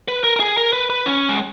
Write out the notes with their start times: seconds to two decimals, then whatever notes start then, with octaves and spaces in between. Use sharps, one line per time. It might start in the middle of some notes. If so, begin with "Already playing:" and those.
0.08 B4
0.24 A#4
0.36 A#4
0.40 G#4
0.57 A#4
0.73 B4
0.90 B4
1.06 C#4
1.29 G#3